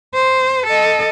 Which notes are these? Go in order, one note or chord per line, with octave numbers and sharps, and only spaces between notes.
C5
A4 D#5